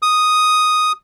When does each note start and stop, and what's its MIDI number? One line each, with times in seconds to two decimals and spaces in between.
0.02 0.92 87